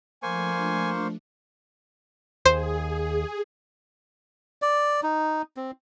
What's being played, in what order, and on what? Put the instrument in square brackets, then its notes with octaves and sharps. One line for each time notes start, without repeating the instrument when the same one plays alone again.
[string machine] F3 A3 D4 [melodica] A#3 C5 C#6 [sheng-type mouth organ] G#5
[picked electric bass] D#2 [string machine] G#4 [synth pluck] C5
[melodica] D5
D#4
C4